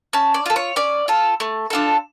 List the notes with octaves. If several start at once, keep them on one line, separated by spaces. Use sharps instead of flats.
C#4 A5
D5
F4 A4
C#5
C#4 D5
F4 A4
A3
D4 F4 A4